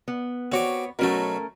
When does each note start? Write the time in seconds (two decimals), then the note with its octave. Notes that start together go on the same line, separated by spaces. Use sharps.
0.08 B3
0.52 B3 C4 F#4 C#5 D6
0.99 B2 F#3 A3 C#4 F#4 A#4